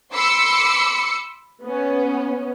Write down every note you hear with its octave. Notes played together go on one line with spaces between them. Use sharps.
B5 C6 D6 E6 C7 C#7
B3 C#4